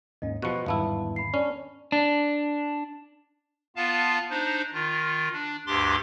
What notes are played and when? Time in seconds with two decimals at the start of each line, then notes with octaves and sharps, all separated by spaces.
0.22 D#2 G#2 C#4 D#5
0.42 B2 F3 F#4 G4 B5 C#6 F#6 C#7
0.66 G1 E2 G#2 D#3 B3 E4 F5 A5
1.16 B5 C7
1.34 C#4 D4
1.92 D4
3.76 B3 F4 F5 A5
4.30 D4 D#4 C5
4.73 D#3 F4
5.33 D4
5.67 D2 G2 D4 G4 C6 D6